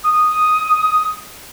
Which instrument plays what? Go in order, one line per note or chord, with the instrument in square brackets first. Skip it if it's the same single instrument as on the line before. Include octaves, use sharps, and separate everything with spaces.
[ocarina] D#6